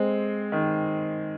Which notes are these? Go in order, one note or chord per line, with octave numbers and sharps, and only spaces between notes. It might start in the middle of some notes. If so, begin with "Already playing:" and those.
Already playing: G#3 C4
D#3